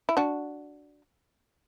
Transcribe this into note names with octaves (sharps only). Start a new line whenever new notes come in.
E4
D4 F#4